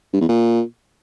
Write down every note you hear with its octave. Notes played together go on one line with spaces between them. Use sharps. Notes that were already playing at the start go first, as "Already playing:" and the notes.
G2
E2
A#2